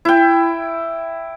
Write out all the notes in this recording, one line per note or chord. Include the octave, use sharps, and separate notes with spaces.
E4 G5